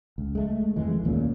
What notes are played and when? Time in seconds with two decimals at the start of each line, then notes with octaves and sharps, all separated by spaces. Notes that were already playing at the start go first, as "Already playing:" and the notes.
0.18 C#2
0.35 G#3 A3
0.76 F2 E3 G#3
1.04 A1 D#2 A#2 C#3